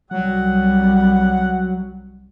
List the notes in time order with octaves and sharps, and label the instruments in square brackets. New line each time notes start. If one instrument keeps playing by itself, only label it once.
[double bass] C2 G3 [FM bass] F#3 [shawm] F#5